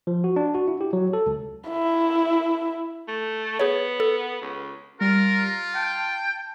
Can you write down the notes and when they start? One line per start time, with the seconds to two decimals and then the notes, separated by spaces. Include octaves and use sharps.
0.07 F3
0.24 F#4
0.36 D4
0.54 F#4
0.68 E4
0.81 G4
0.93 F#3
1.13 A4
1.26 C#2
1.69 E4
3.08 A3
3.59 B3 G#4 C#5
4.00 A4
4.41 C#2
5.01 G3 F4 A#4
5.75 G5 A5